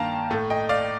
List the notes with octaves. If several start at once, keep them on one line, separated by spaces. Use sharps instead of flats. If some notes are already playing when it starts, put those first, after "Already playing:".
Already playing: G2 D#3 A#3 F5 G5 A5 A#5
A2 A3
D#5 G5
D5 F5